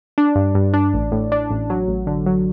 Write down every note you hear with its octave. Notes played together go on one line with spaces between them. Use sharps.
D4
G2
G2
D4
A1
A2
D4
A1
F#3
A1
D3
F#3